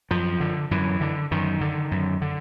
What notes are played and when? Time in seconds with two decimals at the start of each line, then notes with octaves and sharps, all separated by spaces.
0.11 F#2 F3
0.40 D3
0.71 F#2 E3
1.01 D3
1.31 F#2 D#3
1.61 D3
1.91 F#2
2.22 D3